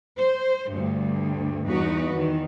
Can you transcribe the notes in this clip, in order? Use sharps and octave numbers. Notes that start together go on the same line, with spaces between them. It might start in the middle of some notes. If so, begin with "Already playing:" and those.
C5
D2 G2
E2 D#4 F#4 B4
E2 D#3